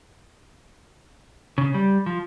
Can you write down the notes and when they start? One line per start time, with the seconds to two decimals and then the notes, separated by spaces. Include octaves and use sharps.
1.58 C#3
1.74 G3
2.06 F3